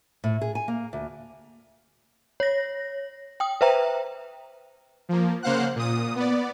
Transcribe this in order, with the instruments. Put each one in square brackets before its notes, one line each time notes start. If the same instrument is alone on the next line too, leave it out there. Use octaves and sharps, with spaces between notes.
[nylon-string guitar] A2
G#4
G#5
A#3
D2
[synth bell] C#5 A#6
G5 D#6
B4 C5 E5 G5 A#5
[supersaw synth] F3 A#3
C#3 A#3 C5 F5 F#5 F#6
A#2 D#6
B3 D5